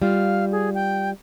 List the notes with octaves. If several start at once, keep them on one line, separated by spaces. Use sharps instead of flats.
G3 F4 F5
G#4
G5